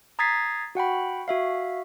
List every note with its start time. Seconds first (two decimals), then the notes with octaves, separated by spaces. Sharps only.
0.19 A#5 D#6 G#6 A6 B6 C7
0.75 F#4 F#5 G5 B5
1.28 F#4 E5 F5